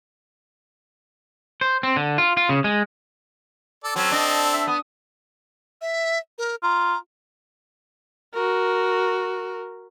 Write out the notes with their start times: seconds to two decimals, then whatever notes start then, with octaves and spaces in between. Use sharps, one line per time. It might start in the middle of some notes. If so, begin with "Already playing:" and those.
1.61 C5
1.83 C4
1.96 D3
2.18 F4
2.37 F4
2.49 C#3
2.64 G#3
3.84 A4 D5
3.96 F#3 C4 C#4 A4
4.12 D4 D#5
4.53 E5
4.67 B3 D#6
5.81 E5
6.38 A#4
6.63 F4 A#5
8.34 F#4 A#4